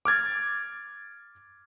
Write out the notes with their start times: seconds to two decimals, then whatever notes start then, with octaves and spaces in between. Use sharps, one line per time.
0.05 D6 F6 G#6 A6